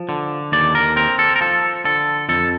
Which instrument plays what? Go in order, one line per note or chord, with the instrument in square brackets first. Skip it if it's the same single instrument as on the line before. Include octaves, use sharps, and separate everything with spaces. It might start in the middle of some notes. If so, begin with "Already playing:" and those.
Already playing: [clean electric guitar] F3
D3
D#2 D5
A#4
C4 A#4
A4
A#4
F3 A4
D3 A4
F2 A4